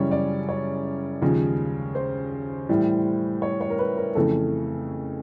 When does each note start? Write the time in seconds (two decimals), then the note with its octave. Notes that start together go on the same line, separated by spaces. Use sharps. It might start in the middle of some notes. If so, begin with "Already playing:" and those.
Already playing: F#2 C#3 E3 G3 C#5
0.11 D5
0.49 C#5
1.22 D#2 C#3 F3 G#3
1.95 C5
2.69 A2 E3 G3
3.42 C#5
3.61 C#5
3.70 A#4
3.79 B4
3.97 A#4
4.15 F2 C#3 E3 A3 A4